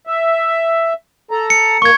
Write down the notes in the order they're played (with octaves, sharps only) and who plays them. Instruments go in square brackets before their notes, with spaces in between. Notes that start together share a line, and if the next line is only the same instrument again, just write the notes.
[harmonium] E5
A4 A#5
[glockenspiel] C#7
[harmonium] A#3 [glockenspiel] C#6 G#6